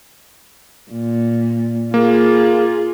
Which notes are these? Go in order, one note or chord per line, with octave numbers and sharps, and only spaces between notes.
A#2
A#3 F4 G#4